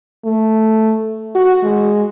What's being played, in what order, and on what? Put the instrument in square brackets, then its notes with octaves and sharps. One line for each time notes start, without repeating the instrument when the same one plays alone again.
[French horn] A3
F#4
G#3